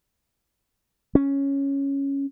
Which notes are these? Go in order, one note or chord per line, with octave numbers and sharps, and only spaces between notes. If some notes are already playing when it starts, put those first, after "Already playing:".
C#4